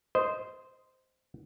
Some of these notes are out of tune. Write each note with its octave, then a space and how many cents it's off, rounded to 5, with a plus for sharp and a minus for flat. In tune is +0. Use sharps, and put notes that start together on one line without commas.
C5 -10 D#5 +0